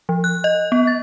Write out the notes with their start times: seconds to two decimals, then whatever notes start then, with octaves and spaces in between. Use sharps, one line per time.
0.09 F3
0.24 F#6
0.44 D#5
0.72 B3
0.87 A6